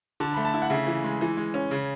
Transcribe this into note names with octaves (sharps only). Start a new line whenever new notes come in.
D3 A5
A3 B5
A5
E4
F#5
C#3 E5
E3
G#3
E3
G#3
C#4
C#3